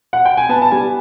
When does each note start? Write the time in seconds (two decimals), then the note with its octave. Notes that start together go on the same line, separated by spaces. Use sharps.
0.13 F#5
0.26 G5
0.37 G#5
0.49 B3 A5
0.62 A5
0.71 G3 G#5